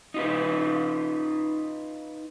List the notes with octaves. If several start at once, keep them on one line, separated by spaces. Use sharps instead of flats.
D#4 F4 B4